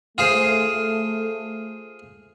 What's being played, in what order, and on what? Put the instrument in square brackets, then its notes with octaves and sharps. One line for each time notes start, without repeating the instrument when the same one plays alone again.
[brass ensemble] A3 [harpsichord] F4 G#4 C5